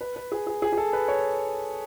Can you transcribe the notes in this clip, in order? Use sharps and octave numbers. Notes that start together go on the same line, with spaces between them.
B4
B4
G#4
G#4
G#4
G#4
A4
B4
C#5